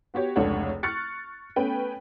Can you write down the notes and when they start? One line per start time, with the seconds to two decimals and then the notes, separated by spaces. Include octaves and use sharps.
0.14 B3 F#4 G4 C#5
0.36 F1 C#2 D4 A4 C#5 F#5
0.83 C#6 F6 F#6 A6 C#7
1.56 A3 B3 C#4 B4 G5